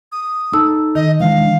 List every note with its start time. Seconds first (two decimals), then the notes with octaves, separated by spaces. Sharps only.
0.12 D#6
0.53 D#4 A4 A5 E6
0.95 D#3 D#5
1.20 E3 G#3 D4 F5